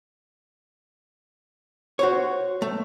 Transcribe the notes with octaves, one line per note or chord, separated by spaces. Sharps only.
F#4 C5 C#5
A3